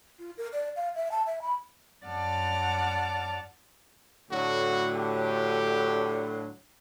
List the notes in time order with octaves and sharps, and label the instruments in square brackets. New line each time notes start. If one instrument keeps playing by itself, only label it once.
[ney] F4
A#4
D5
F5
E5
A5
E5
B5
[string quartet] F#2 D5 F#5 A5 D6 F6
[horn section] A2 D3 F#3 [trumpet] F#4
[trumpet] G4